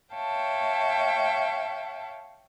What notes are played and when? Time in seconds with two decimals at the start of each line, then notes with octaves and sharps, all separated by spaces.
0.15 C#5 E5 F5 G5 A5